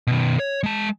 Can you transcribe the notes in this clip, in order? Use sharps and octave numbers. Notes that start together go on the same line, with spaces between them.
B2 D#3
C#5
G#3 A5